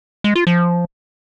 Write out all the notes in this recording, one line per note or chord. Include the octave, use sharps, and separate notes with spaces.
G#3
F4
F3